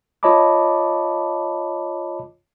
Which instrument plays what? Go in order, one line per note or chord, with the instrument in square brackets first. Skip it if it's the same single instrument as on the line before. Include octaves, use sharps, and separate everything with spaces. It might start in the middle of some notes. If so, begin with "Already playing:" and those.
[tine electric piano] F4 C#5 D#5 A5 B5 D6